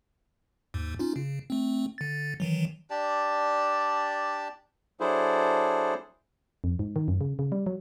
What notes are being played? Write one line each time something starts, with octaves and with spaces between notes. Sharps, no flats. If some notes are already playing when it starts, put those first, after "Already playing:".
D#2 G#2
C#4 D#4 F4
C#3
A3 C4
D3 A6
D#3 E3 F#3
D4 G4 D5 A5
F#3 D4 E4 G#4 A4 C5
F2
G#2
D#3
F#2
C#3
C#3
G3
F#3